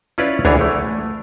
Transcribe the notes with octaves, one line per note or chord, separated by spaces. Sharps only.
C#4 E4 F4 B4 C#5 D5
D2 E3 D4 G#4 A#4 C#5
A3